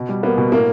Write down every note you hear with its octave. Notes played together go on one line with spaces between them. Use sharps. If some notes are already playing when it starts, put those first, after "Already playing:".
Already playing: B2
G3
A#3 B3
B2
A2 A#3